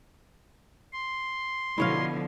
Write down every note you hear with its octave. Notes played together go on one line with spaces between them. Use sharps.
C6
B2 D3 F3 E4 C#5 F5